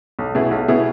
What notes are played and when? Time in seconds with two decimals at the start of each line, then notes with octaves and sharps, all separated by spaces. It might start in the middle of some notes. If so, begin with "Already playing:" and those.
0.19 B1
0.35 B2 B3 E4 G#4
0.51 B1
0.68 B2 B3 E4 G#4